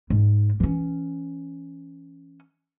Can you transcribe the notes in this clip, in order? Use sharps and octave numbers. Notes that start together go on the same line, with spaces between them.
G#2
E3 C#4